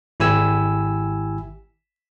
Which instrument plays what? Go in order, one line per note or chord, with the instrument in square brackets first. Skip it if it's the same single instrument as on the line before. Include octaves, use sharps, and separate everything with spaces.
[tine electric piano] G#1 E4 G4 G#5 E6